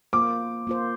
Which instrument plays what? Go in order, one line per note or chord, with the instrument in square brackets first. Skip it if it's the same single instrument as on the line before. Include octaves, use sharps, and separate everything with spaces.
[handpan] A#3 F4 C5 [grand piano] D6
[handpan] A#3 F4 C5